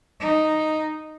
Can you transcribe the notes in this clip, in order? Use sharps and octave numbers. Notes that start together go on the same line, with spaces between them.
D#4